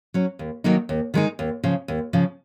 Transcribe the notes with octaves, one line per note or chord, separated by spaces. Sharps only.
F#3 C#4
D#2
D#3 F#3 A#3 D#4
D#2
D#3 G#3 D#4
D#2
C#3 F3
D#2
C#3 F3